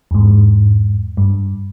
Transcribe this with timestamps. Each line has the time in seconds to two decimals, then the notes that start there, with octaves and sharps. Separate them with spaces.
0.11 E2 G#2
1.17 G2